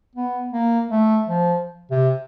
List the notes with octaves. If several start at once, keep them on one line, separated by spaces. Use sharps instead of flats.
B3
A#3
A3
F3
C3